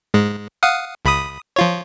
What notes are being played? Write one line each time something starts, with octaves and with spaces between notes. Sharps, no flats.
G#2 G#3
F5 F#5 D#6
C#2 B5 D#6
F3 F4 C#5